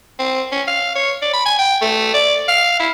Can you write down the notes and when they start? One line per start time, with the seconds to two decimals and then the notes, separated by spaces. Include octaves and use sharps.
0.19 C4
0.52 C#4
0.67 F5
0.95 C#5
1.22 D5
1.33 B5
1.46 G#5
1.58 G5
1.81 A3
2.14 D5
2.48 F5
2.80 E4